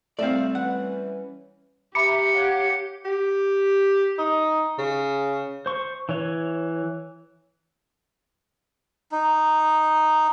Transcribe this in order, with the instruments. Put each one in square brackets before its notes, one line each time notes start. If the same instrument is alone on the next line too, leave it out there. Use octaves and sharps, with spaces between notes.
[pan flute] G3 [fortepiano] A3 C4 [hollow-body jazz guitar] D5 E5 F5
[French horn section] E3 C#4 B4 [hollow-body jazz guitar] F#5
[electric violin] G4 [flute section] E5 [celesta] A#5 B5 D6 [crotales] C#7
[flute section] C#5 F5 F#5
[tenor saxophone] G4
D#4
C#3
[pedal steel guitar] C5 C#6
E3 C#5
[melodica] D#4